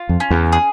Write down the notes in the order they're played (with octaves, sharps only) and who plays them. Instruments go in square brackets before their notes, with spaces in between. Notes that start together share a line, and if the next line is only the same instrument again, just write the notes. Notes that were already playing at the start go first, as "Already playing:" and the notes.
Already playing: [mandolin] F4
[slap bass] F2
[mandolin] C#4
[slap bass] E2
[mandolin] G#4